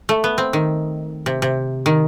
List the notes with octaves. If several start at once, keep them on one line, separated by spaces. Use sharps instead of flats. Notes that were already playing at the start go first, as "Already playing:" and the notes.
A3
B3
C4
D#3
C3
C3
D#3